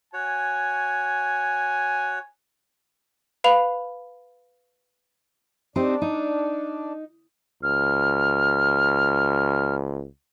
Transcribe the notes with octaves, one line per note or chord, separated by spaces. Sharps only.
F#4 C#5 G#5
B4 F5 B5 F7
C4 D4 D#4 G4
D#4
C#2 F6